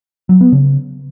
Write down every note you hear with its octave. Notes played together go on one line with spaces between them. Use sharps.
F#3
B3
C#3